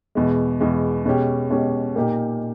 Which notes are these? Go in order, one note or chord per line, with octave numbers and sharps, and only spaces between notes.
E2 B2 G#3
E2 B2 G#3
B2 G#3 C#4 G4
B2 G#3 C#4 G4
A#2 A#3 D#4 G4